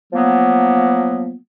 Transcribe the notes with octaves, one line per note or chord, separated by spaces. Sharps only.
F3 F#3 A#3 B3